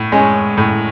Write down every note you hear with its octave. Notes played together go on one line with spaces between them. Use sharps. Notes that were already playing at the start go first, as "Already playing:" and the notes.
Already playing: A2
G#3 C#4
A2